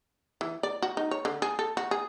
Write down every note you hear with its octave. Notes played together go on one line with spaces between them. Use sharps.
E3
D5
F#4
D#4
C#5
D3
G#4
A4
F#4
G#4